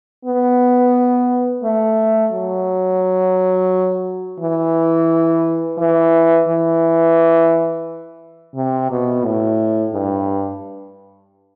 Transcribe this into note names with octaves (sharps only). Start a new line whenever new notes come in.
B3
A3
F#3
E3
E3
E3
C3
B2
A2
G2